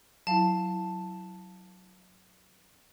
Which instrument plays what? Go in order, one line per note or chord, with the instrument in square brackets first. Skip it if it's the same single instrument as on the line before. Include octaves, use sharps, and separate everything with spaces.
[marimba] F#3 E4 [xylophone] F5 A5